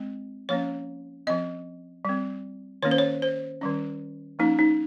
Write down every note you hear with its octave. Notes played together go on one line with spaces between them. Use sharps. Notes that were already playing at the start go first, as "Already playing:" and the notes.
Already playing: G#3 C4
F3 A#3 C#4 C#5
F3 C4 D#5
G3 C4
D#3 A#3 C#4 C#5
C5
C#5
C5
D#3 G3 C#4
F3 A#3 C#4 D#4
D#4